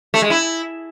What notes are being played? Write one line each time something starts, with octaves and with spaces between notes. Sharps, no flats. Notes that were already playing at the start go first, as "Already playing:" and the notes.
A3
G#3
E4